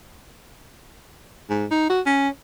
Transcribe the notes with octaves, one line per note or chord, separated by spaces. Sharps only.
G#2
D#4
F#4
C#4